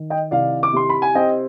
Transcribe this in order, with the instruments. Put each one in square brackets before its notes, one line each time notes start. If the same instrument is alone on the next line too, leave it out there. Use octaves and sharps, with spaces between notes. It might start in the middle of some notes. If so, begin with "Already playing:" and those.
Already playing: [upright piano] D#3
D#5 G5
C2 D5 F5
D6
C3 C6
B5
G#5
C4 D#5 G5